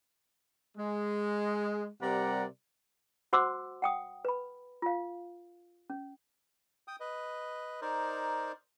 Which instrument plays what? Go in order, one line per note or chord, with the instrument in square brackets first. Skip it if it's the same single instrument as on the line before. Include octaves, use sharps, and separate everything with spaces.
[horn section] G#3
C3 G3 A#4 D5 F#5 A#5
[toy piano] F#4 C5 F#5 C6 D6 E6
F#5 G5 D#6
B4 B5
F4 F5
C#4
[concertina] G5 D#6
B4 D#5
D#4 A#4 C5 D5